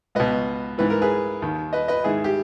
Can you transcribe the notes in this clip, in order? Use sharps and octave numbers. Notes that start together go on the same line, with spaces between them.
C#2 B2 B4 D#5
G#2 E3 B4
A#4
G#4 B4
D#2 D#3
B4 D#5
B4 D#5
G#2 D#3 E4 G#4
G4